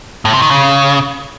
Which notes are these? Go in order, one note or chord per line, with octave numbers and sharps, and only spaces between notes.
A2
C3
D#3
C#3